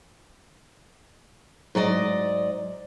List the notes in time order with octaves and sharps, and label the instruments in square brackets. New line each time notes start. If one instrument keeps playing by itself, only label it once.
[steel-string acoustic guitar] G#2 F#3 D5 D#5